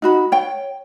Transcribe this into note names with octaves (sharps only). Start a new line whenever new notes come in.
D#4 F#4 B5
C#5 G5